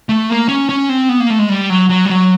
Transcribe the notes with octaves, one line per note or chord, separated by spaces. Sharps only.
A3
A#3
C#4
C#4
C4
B3
A#3
A3
G#3
G3
F#3
F#3
G3
F#3